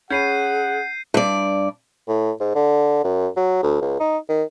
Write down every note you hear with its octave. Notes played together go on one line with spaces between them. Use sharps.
C#4 G#4 F#5 B5 G6 C7 D#7
G2 D5
A2
G#2
D3
F#2
F#3
D2
C#2
D#4
D#3